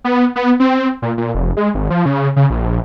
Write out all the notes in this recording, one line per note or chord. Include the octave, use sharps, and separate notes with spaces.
B3
B3
C4
A#2
A#2
F1
G#3
G#1
F3
C#3
C#3
A#1